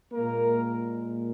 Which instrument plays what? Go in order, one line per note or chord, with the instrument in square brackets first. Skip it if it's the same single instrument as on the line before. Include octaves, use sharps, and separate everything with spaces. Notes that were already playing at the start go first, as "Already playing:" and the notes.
[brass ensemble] A#2 G#3 A#3 A#4